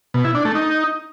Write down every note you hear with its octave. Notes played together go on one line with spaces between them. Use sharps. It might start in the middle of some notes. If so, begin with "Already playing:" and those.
B2
E4
D4
A3
D#4